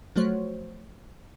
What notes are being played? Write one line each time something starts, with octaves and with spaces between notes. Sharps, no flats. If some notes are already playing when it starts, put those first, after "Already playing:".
F3 F#3 A3 F#4 C5 C#5